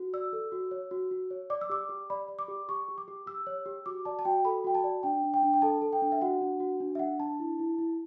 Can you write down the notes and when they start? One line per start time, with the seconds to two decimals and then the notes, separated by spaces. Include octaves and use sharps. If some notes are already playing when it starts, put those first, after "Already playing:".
Already playing: F#4
0.13 D5 E6
0.33 A4
0.52 F#4
0.71 C#5
0.91 F#4
1.11 F#4
1.31 C#5
1.50 D5 D6
1.61 E6
1.70 G4 D6
1.89 G4
2.10 D5 B5
2.28 D5
2.39 D6
2.48 G4
2.69 G4 C#6
2.88 G4
2.98 D6
3.08 G4
3.26 G4 E6
3.47 C#5
3.66 G4
3.86 F#4 D6
4.05 D5 A5
4.19 A5
4.25 F#4 G5
4.45 A4 B5
4.64 F#4 G5
4.75 A5
4.84 D5
5.03 D4 G5
5.24 D4
5.34 G5
5.43 D4
5.53 G5
5.62 A4 A5
5.82 A4
5.93 G5
6.02 D4
6.12 E5
6.21 F#4 F#5
6.41 D4
6.60 F#4
6.80 D4
6.95 E5
6.99 D4 F#5
7.19 D4 A5
7.40 E4
7.59 E4
7.79 E4